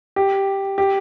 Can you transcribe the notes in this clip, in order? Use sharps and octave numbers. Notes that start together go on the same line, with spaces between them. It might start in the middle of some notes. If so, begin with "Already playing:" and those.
G4
G4